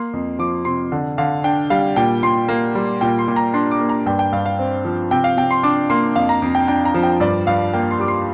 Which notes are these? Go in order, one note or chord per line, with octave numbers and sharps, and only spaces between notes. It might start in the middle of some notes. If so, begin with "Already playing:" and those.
Already playing: A#3 C6
F2
F3 D6
C3 C6
D3
D3 F5
D4 G5
G3 F5
A#2 G5
A#2 C6
A#3
G3
A#2 G5
C6
A#2
A#5
D4 C6
D6
A#3
A#5
G2 G5
G5
G2 F5
F5
C4
F3
C3 G5
F5
C3 G5
C6
D4 D6
A#3 C6
F2 F5
A#5
F2
G5
D4 G5
A#5
F3
G5
G2 D5
G2 F5
A#3 G5
C6
G3 D6
C6